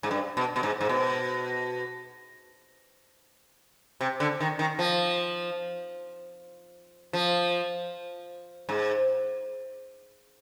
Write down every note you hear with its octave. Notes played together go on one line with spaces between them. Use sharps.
G#2
G2
B2
B2
G#2
G#2
B2
C3
D3
D#3
D#3
F3
F3
G#2